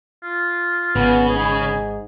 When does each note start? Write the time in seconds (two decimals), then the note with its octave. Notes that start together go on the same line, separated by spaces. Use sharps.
0.24 F4
0.96 G#1 C#3 B3
1.29 G#2 G#4